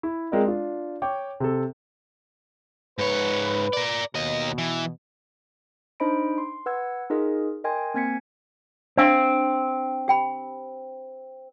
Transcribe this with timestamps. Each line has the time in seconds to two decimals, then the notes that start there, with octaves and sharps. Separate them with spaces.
0.03 E4
0.32 G#3 C4 F4 A#4 D5 D#5
0.45 D4 F4
1.02 C#5 G5 D6
1.40 C3 A4
2.99 G#2 B4 C#5
3.73 A#4 D5
4.15 D#2 B2 D#5
4.58 E3
6.00 D4 D#4 C5 D#5 B5 D7
6.38 C6
6.66 B4 F#5 E6 G#6
7.10 D#4 F4 G#4 A#4 D#5
7.64 A#4 D#5 G5 G#5 C6 G#6
7.94 A#3 C4 G#5 G#6 B6 C#7
8.97 C4 D4 F5
10.08 G4 G5 B5